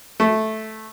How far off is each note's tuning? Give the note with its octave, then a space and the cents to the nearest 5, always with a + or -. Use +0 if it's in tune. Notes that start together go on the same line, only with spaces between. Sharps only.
A3 -10